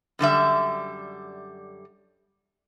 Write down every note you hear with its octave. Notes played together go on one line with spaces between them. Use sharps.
F#2 D3 G3 E5